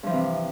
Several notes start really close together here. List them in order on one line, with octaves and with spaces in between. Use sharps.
G2 F3 E3 C3